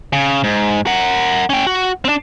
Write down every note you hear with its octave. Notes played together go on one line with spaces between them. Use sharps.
C#3
G#2
A#4 F#5
C#4 G5
F#4
C4 D4